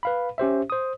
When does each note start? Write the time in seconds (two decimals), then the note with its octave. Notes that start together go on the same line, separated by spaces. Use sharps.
0.03 B4 F5 B5
0.38 C#4 G4 C5 E5
0.70 C5 D#6